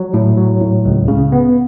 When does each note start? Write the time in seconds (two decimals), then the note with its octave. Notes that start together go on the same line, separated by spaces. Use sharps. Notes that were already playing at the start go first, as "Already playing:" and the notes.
Already playing: F#3
0.14 A2
0.37 F#3
0.61 A2
0.85 C#2
1.08 C#3
1.32 B3